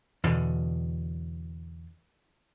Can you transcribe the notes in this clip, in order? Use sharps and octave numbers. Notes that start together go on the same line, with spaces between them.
E2 B2 D3